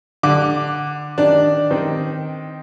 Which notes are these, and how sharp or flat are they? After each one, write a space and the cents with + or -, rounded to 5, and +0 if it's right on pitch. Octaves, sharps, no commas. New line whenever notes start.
D3 +10 D6 +0
D#3 +0 D4 +0
D#3 +0 C4 +0